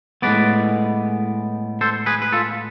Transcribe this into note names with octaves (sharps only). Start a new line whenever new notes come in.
A2 G#3 B3 B4 D5
A4 C5
G#4 B4
B4
F4 A4